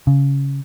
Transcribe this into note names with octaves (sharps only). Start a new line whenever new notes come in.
C#3